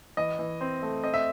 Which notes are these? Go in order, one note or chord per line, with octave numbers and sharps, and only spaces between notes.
E3 D#5
E3
C4
A3
C4 D#5
E5